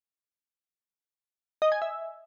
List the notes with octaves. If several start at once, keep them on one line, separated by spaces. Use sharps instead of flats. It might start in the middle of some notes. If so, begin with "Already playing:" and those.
D#5
G#5
E5